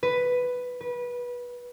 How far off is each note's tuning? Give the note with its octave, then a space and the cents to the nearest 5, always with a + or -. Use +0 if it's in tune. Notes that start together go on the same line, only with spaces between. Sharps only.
B4 +5
B4 -20